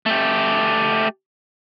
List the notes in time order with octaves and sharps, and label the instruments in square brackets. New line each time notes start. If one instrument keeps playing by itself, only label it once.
[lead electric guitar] A3 G4